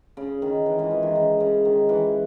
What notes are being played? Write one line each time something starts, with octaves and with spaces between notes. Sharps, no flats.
C#3
D#3
E3
E3 G#3
E3
D#3
C#3
C#3
D#3
E3